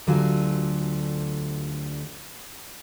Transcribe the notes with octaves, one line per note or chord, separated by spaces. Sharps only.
D2 D3 F#3 G3 F4 G#5